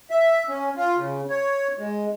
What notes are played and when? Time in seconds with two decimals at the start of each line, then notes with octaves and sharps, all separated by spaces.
0.10 E5
0.49 C#4
0.76 F4
0.96 C#3
1.30 C#5
1.79 G#3